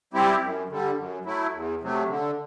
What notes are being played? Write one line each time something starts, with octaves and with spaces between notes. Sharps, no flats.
G3 C4 E4 G4
F#2
D3 G3
F#2
F#3 A3 E4
E2
C3 F#3 A3
D3